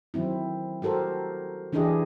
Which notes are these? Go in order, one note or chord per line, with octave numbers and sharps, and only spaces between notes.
D#3 F#3 C4 E4
F#4 G4 A4 A#4 C5
E3 D4 E4 G4 G#4 D#5